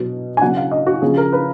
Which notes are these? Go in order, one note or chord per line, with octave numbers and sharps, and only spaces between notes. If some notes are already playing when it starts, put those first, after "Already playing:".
Already playing: B2 F#3
G#5
C#3 F#3 F#5
F5
D#5
F#4
C#3 F3 G#4
A#4
B4